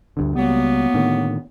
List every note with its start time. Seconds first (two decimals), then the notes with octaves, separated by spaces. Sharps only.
0.17 D2 G2 D3
0.35 C#2 F#3 G3 A#3 B3
0.94 A2 D3 D#3